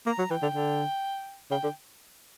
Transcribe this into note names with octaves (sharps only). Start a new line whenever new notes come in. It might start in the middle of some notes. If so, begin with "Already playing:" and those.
A#3 A#5
F#3
E3 G5
D3
D3
C#3 G5
D3